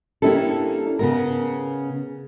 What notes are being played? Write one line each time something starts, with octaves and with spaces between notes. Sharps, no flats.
A#3 C#4 D4 E4 G4 A4
C#3 B3 A#4